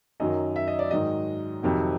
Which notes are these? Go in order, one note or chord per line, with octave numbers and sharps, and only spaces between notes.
F#2 D#3 F#3 D#5
E5
D#5
D5
G#2 D#3 F#3 D#5
F2 C3 D#3 F#3